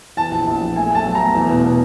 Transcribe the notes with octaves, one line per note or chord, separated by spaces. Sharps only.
E3 A5
A#1
A#1
A#1
A3 G#5
A3 A5
F#3
A#5
A3
E2
B2
B2